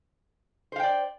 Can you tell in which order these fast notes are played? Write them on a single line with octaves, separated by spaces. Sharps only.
C5 F5 G5 D5